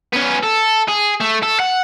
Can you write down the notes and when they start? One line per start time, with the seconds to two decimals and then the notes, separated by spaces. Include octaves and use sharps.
0.13 B3 C#4
0.43 A4
0.88 G#4
1.20 A3
1.43 A4
1.60 F#5